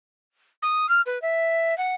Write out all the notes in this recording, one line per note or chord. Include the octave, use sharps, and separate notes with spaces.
D#6
F6
B4
E5
F#5